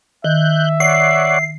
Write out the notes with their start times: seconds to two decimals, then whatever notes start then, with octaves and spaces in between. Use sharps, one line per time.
0.24 D#3 E5 F#6 G6
0.80 C#5 D5 F#5 C7